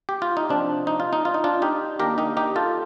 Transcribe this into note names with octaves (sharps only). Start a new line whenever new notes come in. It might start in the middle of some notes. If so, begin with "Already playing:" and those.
G4
F4
D#4
C3 F3 C4 D4
D#4
F4
D#4
F4
D#4
D4 F4
D#4 G4
D#3 A#3 D4 G4 A#4
D#4 G4
D#4 G4
F4 A4